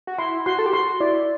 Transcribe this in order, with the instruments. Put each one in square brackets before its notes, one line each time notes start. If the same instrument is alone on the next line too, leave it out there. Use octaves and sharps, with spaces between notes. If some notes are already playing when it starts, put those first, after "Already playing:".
[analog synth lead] F#4
[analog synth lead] E4 [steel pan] C6
[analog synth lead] F#4 [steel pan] C6
[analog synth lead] A4
G4
[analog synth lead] F#4 [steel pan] C6
[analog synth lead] E4 [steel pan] D5